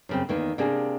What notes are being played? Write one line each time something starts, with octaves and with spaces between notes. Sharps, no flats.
F#2 C#3 C4
E2 D#3 A#3
C3 A#3 D4 G#4